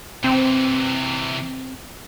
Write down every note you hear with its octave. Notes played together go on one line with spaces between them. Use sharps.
C3 E3 C4